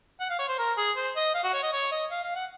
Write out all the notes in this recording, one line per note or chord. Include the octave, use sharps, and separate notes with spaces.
F#5
F5
C#5
C5
A#4
G#4
C5
D#5
F5
F#4
C#5
D#5
C#5
D#5
F5
F5
F#5